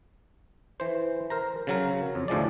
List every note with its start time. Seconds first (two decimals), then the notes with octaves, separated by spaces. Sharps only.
0.80 E3 C5
1.30 A#4 C5 A#5
1.67 C#3 F#3 A#4
2.15 F2
2.28 D2 A2 F3 G#3 D5